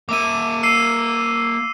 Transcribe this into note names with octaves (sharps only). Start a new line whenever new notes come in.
A#3 E5 D6 D#7
E6 C7 D#7